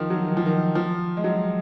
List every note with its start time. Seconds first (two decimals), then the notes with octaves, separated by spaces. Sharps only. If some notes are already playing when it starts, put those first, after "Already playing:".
Already playing: D#3 F3
0.10 F#3
0.27 D#3
0.37 F3
0.46 D#3
0.75 F3
1.17 G#3
1.24 F#3